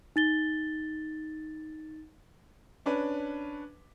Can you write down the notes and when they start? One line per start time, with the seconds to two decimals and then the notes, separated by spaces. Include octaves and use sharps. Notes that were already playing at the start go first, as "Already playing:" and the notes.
0.16 D#4 A6 G7
2.86 C#4 D4 B4